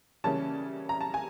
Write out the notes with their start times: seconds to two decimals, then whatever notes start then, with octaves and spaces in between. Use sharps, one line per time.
0.24 C#3 E3 G3 A#3 C#4 A5
0.89 A#5
1.01 A5
1.14 G#5